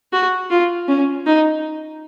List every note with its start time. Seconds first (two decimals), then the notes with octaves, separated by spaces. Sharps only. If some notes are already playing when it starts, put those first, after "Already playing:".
0.13 F#4
0.50 F4
0.88 C#4
1.26 D#4